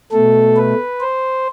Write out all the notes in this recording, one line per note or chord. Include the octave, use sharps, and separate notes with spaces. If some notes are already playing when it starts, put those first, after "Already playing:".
B2 A3 A4
B4
C5